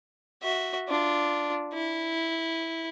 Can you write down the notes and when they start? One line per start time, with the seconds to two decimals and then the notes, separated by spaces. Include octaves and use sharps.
0.43 F#4 E5
0.88 D4 F4
1.74 E4